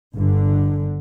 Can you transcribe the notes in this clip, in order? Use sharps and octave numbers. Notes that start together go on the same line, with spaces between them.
G1 D3